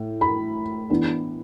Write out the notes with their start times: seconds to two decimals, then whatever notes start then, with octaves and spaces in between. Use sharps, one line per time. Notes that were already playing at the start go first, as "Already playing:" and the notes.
Already playing: A2
0.21 B5
0.90 E3 B3 D4